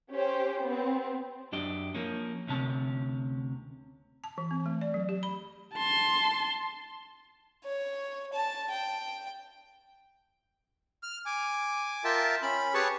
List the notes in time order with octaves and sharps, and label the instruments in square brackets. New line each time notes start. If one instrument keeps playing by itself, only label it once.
[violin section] C#4 G4 C5
B3 C4
[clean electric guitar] F#2 D4 G4 D#5
F3 A#3 C#4
D2 C3 C#4 A5
[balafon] A5
E3
C4
A3
D5
F#3
G4
B5
[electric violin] A5 C6
[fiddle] C#5
A5
G5
[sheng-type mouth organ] F6
G#5 D6
F4 A#4 E5 G5 A5
C#4 B5
G4 G#4 B4 C#5 A5 C#6